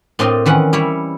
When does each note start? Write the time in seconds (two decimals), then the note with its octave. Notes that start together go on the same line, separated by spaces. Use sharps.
0.19 A2 C4 D4 A#4 D#5 C6
0.46 D#3 E3 C#4 F#5
0.73 G3 E4 C#5